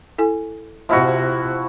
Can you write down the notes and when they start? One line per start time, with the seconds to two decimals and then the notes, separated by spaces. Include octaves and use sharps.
0.18 E4 A4 G#5
0.89 C3 F3 E4 F#4 D#5 E5